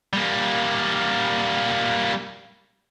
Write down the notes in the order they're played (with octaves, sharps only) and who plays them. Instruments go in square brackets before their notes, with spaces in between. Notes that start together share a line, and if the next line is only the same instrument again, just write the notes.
[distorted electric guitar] G3 A#3